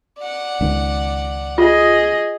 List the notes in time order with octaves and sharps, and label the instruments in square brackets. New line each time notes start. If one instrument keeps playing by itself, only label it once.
[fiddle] D5 F#5
[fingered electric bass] C#2 D#3
[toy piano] F4 [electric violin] G#4 D#5